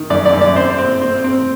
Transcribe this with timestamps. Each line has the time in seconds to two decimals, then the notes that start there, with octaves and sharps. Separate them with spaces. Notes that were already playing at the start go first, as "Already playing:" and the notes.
Already playing: D#3
0.10 F#2 D5
0.26 D5
0.33 F#2
0.41 D5
0.56 C4 C5
0.78 C4
1.02 C4
1.24 C4